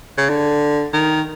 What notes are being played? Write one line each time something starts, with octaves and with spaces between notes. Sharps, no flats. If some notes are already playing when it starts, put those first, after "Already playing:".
C#3
D3
D#3